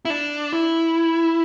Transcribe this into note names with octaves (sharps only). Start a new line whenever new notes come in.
E4
D4
E4